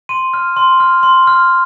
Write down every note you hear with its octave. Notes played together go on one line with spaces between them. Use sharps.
C6 D#7
F6
C6
F6
C6
F6